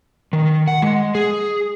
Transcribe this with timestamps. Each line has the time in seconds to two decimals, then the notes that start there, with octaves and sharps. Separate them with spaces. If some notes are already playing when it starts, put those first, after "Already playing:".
0.33 D#3
0.68 F#5
0.82 G#3
1.15 G#4